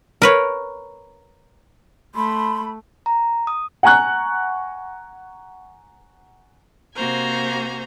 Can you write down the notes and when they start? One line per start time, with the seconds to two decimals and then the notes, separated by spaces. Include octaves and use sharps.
0.22 A#4 B4 C#5
2.15 A3 B5 C6
3.06 A#5
3.47 D#6
3.83 F#5 G#5 A#5 C#6 F#6
6.94 C3 A#3 F#4 C5 G#5 A#5